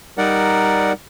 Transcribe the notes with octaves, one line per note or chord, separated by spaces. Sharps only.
G3 D#4 A#4 D5 F#5